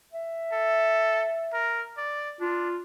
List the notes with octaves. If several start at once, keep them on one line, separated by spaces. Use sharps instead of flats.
E5
A4
A#4
D5
D4 F4